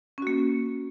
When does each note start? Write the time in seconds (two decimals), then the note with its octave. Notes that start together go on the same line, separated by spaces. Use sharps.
0.18 C#4
0.22 F#4
0.27 A#3